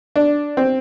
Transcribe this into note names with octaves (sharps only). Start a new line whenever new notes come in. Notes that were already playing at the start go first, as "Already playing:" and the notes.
D4
C4